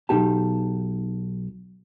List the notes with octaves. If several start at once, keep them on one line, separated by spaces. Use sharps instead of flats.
B1 B2 D#4 G4 A5